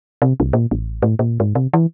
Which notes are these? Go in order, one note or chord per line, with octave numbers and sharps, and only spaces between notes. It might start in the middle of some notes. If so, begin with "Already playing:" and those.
C3
C2
A#2
A1
A2
A#2
G#2
C3
E3